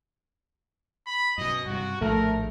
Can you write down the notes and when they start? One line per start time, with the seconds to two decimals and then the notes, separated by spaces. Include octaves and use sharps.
1.06 B5
1.38 F#2 B2 D#5
1.66 G2 C3 F#4
2.01 A#1 A2 D#3 A3 A#4